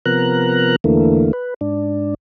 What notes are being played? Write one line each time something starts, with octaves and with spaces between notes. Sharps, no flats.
C3 F3 B3 A#4 A#5 F#6
E2 D3 E3 A3 A#3
B4
G#2 D4